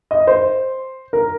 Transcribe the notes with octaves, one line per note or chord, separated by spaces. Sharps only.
D#5
C5
A#4